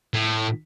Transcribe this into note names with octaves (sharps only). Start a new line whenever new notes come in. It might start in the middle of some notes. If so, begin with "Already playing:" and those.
A2